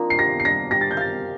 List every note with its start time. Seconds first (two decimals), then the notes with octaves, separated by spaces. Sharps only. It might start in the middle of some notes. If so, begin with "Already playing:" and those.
Already playing: F3 A#3 C4 D4 D#4
0.10 C7
0.19 G4 A#6
0.40 C7
0.45 D4 A#6
0.71 G4 A#6
0.81 A6
0.91 G6
0.97 F5 A6